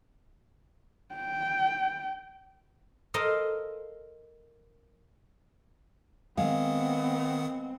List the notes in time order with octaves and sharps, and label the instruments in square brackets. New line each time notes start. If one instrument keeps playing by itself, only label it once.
[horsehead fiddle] G5
[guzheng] A4 A#4 C5 D#5 F5
[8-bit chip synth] D#3 F#5 D#6 [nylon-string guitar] G#3 F5 [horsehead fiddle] B3 C4